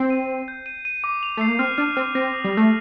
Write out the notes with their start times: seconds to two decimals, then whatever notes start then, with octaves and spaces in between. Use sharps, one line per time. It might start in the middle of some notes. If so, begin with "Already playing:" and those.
Already playing: C4 C7
0.10 D#7
0.29 C7
0.48 G6
0.66 D#7
0.85 D#7
1.04 D6
1.23 F7
1.37 A3 C7
1.48 A#3
1.59 C4 F6
1.78 D4 F6
1.96 C4 F6
2.15 C4 A#6
2.34 D#6
2.44 G3
2.53 A3 A#6